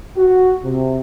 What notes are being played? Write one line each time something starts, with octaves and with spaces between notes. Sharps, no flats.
F#4
C3